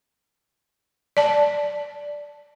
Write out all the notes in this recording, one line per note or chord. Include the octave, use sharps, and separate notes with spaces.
D5 A5